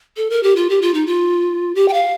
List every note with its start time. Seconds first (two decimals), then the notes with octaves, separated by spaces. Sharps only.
0.17 A4
0.30 A#4
0.43 G4
0.56 F4
0.69 G4
0.82 F4
0.94 D#4
1.07 F4
1.75 G4
1.88 G5
1.93 F5